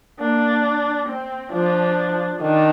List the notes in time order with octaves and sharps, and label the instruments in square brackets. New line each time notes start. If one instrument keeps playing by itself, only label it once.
[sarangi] A#3 [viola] D4
[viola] C4
[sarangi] F3 [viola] D4
[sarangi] D#3 [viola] D4